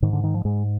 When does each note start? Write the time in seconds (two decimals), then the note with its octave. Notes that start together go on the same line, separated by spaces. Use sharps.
0.02 G#2 D#3
0.13 D3
0.23 D#3
0.34 F3
0.45 G#2 G#3